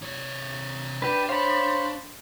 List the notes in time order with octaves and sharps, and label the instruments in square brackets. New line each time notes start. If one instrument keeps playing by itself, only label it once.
[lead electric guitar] C3 C#5
[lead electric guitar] D4 [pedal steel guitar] G4 B4
[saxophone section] C5 C#5 [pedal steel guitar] F5 B5